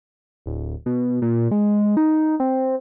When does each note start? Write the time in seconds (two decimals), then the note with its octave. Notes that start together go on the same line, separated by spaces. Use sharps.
0.46 D1
0.86 B2
1.22 A#2
1.51 G#3
1.97 D#4
2.40 C4